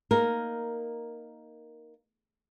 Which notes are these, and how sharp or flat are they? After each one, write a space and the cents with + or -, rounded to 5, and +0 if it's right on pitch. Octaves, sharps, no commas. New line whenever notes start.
A#3 +5 D#4 +0 A#4 +0